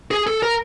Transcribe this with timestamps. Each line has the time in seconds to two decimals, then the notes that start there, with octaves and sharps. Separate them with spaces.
0.11 G#4
0.27 A4
0.43 A#4